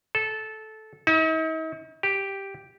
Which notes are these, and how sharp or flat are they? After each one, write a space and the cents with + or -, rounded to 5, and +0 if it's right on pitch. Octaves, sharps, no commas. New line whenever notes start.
A4 -15
D#4 +45
G4 +0